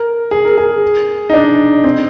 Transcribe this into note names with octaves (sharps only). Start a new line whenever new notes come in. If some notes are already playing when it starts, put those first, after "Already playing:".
Already playing: A#4
G#4
A#4
G#4
D#4
D4
C4